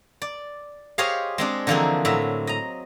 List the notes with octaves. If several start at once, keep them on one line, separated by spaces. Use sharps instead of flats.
D5
G4 G#4 C5 C#5 D#5 F5
G#3 C4 D4
D3 E3 F3 A#3 C4 G#4
A2 F#3 E5
D#5 A#5